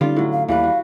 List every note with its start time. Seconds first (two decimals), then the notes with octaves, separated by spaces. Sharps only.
0.01 D3 G3 C#4 D#4 F4
0.16 A2 F#3
0.32 F5
0.48 D#2 E3 G3 B4 F5
0.64 F#4